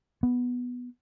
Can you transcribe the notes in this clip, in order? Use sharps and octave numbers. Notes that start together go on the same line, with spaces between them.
B3